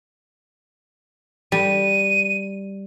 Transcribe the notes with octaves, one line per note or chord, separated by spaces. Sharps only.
G3 D#7